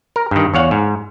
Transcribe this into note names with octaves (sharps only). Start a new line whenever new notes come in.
A#4
G2 D#3
E2 C#5 F5 F#5
G#2